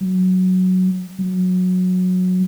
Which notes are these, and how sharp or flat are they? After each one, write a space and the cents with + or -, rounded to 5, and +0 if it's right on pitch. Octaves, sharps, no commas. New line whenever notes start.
F#3 +0
F#3 -15